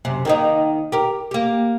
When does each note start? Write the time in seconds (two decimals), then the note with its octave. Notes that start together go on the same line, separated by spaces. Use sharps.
0.05 F#2 C3
0.25 D#3 A#3 D#4
0.92 G4 A#4
1.31 A#3 G4